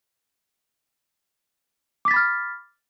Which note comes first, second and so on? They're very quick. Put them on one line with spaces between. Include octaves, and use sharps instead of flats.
D6 B6 A6 B5 F6